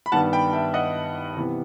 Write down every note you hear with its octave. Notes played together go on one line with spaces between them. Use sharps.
B5
G2 D#3 G3 B3 F#5 A5
G5 B5
E5 G5
D#5 F#5
C3 E3 B3